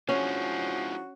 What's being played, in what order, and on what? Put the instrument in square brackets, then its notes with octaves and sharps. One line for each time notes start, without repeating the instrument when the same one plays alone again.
[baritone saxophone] F3 [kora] C#4 [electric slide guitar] D4 E4 G#4 [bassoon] F#4